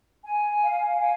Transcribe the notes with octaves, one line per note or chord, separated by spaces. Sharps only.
G#5
F5
G#5